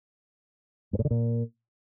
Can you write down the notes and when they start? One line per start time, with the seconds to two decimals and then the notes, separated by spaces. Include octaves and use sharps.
0.93 G2
0.99 A2
1.05 D3
1.11 A#2